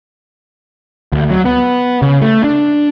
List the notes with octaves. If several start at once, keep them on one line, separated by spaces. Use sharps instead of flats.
D2
F#3
B3
C#3
A3
D4